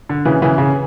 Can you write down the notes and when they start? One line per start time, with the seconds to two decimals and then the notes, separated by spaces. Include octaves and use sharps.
0.09 D3
0.25 C#3 E3
0.42 C#3 E3
0.58 C#3